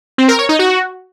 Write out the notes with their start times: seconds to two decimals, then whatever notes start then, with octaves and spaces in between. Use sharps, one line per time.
0.18 C4
0.28 A#4
0.39 C#5
0.49 D#4
0.59 F#4